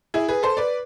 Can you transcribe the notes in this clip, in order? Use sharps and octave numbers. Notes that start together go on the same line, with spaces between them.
E4 G#4
G#4 B4
A4 C5
B4 D5